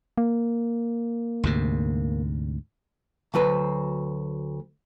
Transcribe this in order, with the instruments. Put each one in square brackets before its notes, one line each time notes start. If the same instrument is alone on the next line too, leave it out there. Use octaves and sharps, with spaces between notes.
[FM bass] A#3
[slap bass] D2 G#2 C3
[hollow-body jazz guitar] D2 F#3 B4 C5